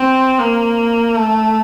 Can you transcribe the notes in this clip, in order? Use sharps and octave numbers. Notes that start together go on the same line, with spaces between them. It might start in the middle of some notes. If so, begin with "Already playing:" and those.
Already playing: C4
A#3
A3